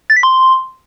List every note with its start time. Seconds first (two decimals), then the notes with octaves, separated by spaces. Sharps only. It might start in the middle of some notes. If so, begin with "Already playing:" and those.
0.10 A6
0.16 B6
0.23 C6